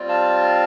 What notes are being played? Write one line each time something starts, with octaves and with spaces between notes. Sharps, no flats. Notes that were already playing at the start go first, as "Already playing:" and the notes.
Already playing: G3 C4 F4
F5 A5